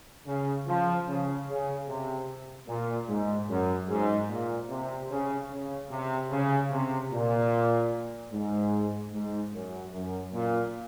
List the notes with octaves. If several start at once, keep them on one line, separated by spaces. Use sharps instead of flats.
C#3
F3
C#3
C#3
C3
A#2
G#2
F#2
G#2
A#2
C3
C#3
C#3
C3
C#3
C3
A#2
G#2
G#2
F#2
F#2
A#2